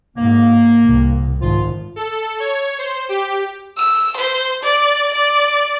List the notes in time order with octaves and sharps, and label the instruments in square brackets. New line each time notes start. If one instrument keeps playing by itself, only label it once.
[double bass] G#2 [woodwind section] A#3
[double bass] C2
[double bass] G#1 [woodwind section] F3 F4
[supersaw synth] A4
C#5
C5
G4
[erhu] E6
C5
D5
D5